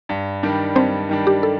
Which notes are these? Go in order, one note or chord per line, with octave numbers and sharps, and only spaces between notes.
G2
D#3 G3 D4
G2 C4 C5
D#3 G3 D4
G4
A4